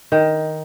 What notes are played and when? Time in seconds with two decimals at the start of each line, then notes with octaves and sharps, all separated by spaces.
0.12 D#3